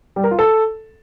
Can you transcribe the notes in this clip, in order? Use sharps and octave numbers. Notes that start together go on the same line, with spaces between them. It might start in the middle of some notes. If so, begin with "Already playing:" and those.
G3
A#4
F4
A4